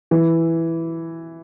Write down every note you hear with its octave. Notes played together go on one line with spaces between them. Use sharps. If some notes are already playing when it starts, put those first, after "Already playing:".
E3